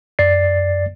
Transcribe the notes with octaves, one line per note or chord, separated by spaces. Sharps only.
F#2 D5 A6 C7